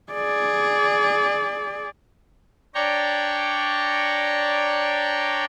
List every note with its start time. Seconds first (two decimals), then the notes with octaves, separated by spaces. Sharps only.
0.13 G#4 D5
2.75 D4 C#5 D5 G5 A#5 C#6